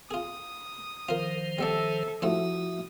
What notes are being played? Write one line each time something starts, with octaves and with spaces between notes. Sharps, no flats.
F4 G#4 D#6
D#3 F3 F4 A#4 C5
G3 B3 A4 D5 E5
G2 F3 A3 E4 F#4 C5 E5 D#6